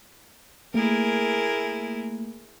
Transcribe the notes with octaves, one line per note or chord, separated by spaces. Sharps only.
A3 A#3 E4 G#4 A#4